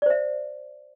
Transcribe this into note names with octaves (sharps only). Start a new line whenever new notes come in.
C5 D5 E5